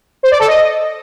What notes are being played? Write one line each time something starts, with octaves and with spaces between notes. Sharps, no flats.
C5
D5
A4
D#5